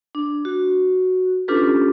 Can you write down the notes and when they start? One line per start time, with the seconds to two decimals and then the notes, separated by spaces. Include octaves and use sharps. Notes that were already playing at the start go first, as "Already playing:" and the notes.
0.15 D4
0.45 F#4
1.48 C#4 D4 F4 G4 A4 B4